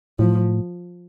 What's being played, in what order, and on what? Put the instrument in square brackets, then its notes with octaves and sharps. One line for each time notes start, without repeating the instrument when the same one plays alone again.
[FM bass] A2 [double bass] F3